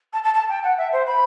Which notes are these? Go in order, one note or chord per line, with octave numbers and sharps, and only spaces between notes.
A5
A5
A5
G5
F#5
E5
C5
B5